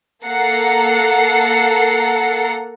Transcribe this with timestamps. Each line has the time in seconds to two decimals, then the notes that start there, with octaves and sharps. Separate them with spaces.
0.24 A#3 A4 F#5 A#5 C7 C#7